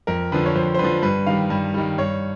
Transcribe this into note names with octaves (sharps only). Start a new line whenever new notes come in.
F2 A#4
D3 F3 B4
C#5
F2 C5
C5
D3 F3 B4
G2 B4
D#3 G3 F5
G2
D#3 G3
G2 C#5